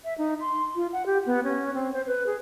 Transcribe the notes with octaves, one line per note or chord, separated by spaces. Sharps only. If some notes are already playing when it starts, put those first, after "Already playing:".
E5
D#4
C6
F4
F#5
G4
B3
C#4
C4
C5
B4
G#4